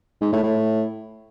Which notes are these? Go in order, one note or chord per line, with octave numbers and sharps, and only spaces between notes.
G#2
A2
A2